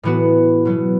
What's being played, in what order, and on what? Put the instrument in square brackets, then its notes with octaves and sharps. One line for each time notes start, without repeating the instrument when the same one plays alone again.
[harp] A2 E3 B3 F#4
B2 F#3 B3